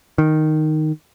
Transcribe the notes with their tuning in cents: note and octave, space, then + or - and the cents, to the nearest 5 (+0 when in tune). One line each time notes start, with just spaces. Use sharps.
D#3 -5